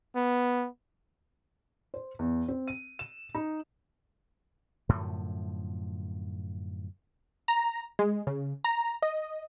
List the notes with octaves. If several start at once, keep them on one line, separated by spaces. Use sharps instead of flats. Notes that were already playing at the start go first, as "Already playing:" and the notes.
B3
C5
E2
C4
D#7
E7
D#4
F#2 A2 D3 F3
A#5
G#3
C#3
A#5
D#5